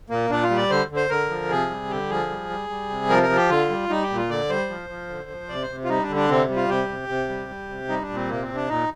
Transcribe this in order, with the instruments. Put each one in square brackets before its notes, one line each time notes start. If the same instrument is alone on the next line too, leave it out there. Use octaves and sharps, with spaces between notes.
[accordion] A#2 A#3
A#2 D4
F4
G3
D5
D3 C5
D3
C5
D3 A#4
F3
C3 G#4
G3
D3 G4
F3 G#4
G3
G3
G3
C3
F3 A#4
A#4
F3
G4
D3 F4
G3
G3 D#4
G4
A#2
F4
D3 D5
G3 C5
F3
F3
D3
F3
C3 D5
C5
C3
F4
G3 D#4
D4
D3
D4
C3 C4
G3
F4
C3 G4
C3
C3
G3
G3
C3
G3 D#4
D4
A#2
C4
C3 A#3
C4
C3
D4
A#2 D#4